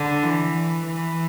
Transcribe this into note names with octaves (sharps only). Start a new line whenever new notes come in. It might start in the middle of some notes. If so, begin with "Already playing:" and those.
Already playing: D3
E3
E3